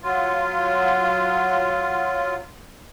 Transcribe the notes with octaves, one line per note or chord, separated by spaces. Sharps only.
F#3 F4